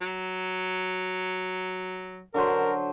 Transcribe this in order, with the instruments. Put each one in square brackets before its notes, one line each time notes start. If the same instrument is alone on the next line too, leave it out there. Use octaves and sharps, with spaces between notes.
[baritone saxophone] F#3
[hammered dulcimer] D3 F#3 C5 [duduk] A#4